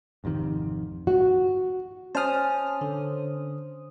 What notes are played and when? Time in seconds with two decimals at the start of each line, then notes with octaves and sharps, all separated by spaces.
0.24 G#1 F2 C3 D#3
1.07 F#4
2.15 C#4 C5 A5 D#6 F6
2.81 D3